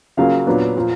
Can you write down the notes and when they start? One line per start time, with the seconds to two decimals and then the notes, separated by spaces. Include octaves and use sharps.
0.17 C#3 F#3 A#3 C#4 F4 F5
0.47 A#2 F#3 B3 D4
0.77 A#2 F3